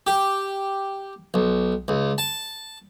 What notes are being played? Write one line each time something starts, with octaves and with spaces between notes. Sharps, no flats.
G4
B1
C#2
A5